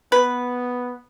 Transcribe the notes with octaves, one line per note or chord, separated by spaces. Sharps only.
B3 B4